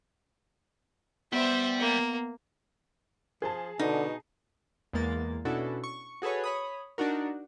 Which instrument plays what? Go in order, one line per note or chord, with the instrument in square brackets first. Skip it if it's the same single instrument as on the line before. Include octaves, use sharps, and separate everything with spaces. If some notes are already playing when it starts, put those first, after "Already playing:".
[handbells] B3 [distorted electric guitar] G4 D5 [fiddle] C5 E5
[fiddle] A#3
[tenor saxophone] F3 [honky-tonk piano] G#4 A5
[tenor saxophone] B2 [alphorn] D3 [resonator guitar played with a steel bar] D#4
[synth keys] E2 G#3 A#3 A6
B2 C#4 D4 E4 F#4 A4
C#6
F#4 G#4 A4 B4 C#5
C#5 B5 D#6
D4 D#4 F#4 A#4